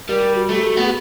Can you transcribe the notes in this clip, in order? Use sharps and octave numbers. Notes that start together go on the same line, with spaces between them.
G3 A#4
F#4
A3
G4
F#4
B3
G#4